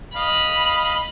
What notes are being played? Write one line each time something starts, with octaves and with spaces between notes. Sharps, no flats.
D#5 F5 B5